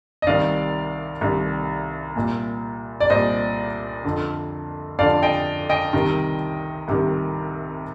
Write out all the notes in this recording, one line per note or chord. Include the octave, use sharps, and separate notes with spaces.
D#5
C2 C3 D#3 D5 F5
C2 C3 D#3
C2 A#2
D5
C2 A#2 C5 D#5
F2 D3
F2 D3 D5 F5
D#5 G5
D#5 G5
C2 C3 D#3
C2 C3 D#3